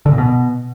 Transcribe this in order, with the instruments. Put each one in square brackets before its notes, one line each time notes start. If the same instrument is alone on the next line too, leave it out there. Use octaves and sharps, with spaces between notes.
[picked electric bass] D3
A#2
B2